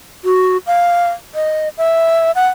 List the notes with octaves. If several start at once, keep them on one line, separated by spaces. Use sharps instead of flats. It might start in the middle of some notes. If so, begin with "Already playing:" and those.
F#4
F5
D#5
E5
F#5